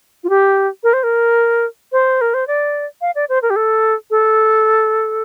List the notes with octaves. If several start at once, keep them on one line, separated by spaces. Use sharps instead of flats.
F4
G4
A#4
C5
A#4
C5
A#4
C5
D5
F5
D5
C5
A#4
G4
A4
A4